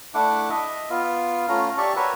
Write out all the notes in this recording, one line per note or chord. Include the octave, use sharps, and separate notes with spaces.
A3 D4 E4 F#5 D6
D#5 E5
B3 F4
A3 C#4 F4 A#5
G4 D5 E5 A5 C#6
F#4 A#4 B4 C#5 E5